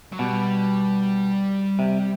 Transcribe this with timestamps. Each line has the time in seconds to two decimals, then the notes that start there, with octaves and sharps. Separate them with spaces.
0.12 F#3
0.19 B2 G3
1.79 C3